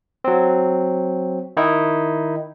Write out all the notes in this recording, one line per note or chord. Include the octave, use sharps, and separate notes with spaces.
F#3 C4
D#3 D#4 E4